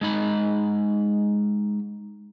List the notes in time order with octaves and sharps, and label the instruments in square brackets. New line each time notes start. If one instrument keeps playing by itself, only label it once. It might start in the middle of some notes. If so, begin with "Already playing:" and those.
[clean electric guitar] G#3 D#4 B5